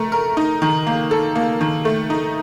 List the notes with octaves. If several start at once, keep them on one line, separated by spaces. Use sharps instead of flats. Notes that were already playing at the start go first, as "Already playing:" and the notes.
Already playing: A3 A#4
A#4
D#4
D#3
A#3
A4
A#3
D#3
A3
D#4